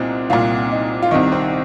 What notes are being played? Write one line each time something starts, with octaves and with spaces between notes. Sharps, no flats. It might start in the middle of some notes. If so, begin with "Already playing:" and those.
Already playing: C2 A#2 C4 D#4
C2 A#2 F4
D#4
F4
C2 C3 D#3 D#4
C4